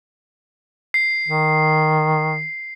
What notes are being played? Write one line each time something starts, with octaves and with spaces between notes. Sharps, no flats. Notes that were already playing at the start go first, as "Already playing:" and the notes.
C7
D#3